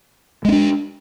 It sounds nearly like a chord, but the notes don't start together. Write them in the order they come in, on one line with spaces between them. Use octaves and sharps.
G#3 C#4 D4